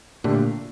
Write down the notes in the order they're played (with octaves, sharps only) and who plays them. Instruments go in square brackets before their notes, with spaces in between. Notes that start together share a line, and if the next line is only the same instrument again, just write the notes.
[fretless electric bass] A#2 [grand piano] D3 A3 D4 G4